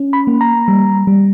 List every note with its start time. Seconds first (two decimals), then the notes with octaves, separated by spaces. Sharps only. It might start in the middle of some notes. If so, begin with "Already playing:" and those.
Already playing: C#4
0.13 B5
0.27 A#3
0.41 A#5
0.68 G3
1.07 G3